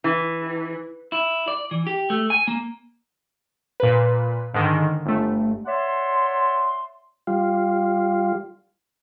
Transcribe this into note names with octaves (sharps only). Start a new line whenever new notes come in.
E3
E4
D5
E3
G4
A3
G#5
A#3
A#2 B4
G#2 D3 D#3
G1 A3
C#5 D5 E5 F#5 C6
G3 F4